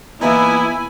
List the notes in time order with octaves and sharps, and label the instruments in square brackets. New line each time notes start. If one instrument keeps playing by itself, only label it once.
[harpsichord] E3 A#3 D#4 [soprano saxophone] B3 [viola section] E4 [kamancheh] G#5 B5